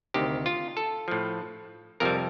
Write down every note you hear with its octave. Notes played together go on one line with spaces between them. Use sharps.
D2 C3 D#3 G4
F4
A4
A2 F3
F2 C3 G3 A#4